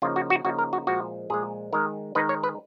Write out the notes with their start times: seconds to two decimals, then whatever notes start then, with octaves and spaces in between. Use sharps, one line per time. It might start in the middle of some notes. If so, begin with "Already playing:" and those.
0.02 C#3 F3 A#3 D#4 F4
0.16 F#4
0.30 F#4
0.45 C#3 F3 A#3 D#4 F#4
0.59 A#4
0.73 F#4
0.87 A#2 F3 G#3 F#4
1.30 A#2 F3 G#3 G#4
1.73 D#3 G#3 D#4 A#4
2.15 D#3 G#3 D#4 B4
2.29 C#5
2.43 B4